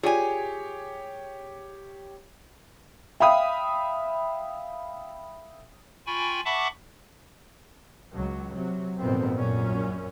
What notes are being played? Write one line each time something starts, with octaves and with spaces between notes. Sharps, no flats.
F4 G4 G#4 C#5 D5 G#5
E5 F5 G5 B5 D#6
F4 G5 G#5 B5 C#6
E5 F#5 A5 B5 C#6 D6
C#2 F#3
C3 F#3
G#1 F2 A#2 B3 C4
A#1 F#2 A#2 C#4